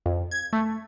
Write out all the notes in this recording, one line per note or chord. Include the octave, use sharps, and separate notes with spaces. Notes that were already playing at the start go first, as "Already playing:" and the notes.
F2
G#6
A3